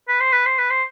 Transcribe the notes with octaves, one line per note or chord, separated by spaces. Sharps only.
B4
C5
B4
C5
B4
C5